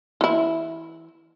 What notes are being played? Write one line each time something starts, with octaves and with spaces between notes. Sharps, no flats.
E3 E4